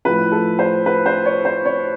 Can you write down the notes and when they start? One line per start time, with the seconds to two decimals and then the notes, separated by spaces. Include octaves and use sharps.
0.05 A2 F3 B4
0.32 A4
0.59 C5
0.86 B4
1.06 C5
1.25 C#5
1.45 C5
1.65 C#5